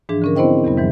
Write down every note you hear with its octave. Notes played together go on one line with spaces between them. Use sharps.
G#2 E3 F3 D4 G#4
D3 C#4 A#4
B3 C4 E4 C5 D#5 G5
E2 C3 G3 B3
E2 G#2 E3 F#3